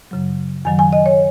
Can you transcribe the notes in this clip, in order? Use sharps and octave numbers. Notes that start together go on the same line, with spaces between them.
F#2 C#3 F#3
F#2 D#3 F#3 G#5
G#5
D#5
C#5